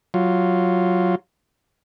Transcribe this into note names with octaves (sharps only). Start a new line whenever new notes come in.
F#3 F4